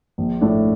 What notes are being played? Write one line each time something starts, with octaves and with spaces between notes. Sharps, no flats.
A#1
A2 F3 A3 D4